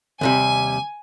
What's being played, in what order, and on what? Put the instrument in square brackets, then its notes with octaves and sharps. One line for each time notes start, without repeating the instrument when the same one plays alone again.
[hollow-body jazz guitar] D#2 C3 G3 [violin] G#5